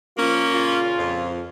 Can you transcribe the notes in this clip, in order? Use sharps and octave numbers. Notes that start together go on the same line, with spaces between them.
F3 A#3 C#4 F4
A#2 C#3 F4
F2